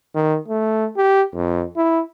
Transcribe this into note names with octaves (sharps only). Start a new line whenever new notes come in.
D#3
A3
G4
F2
E4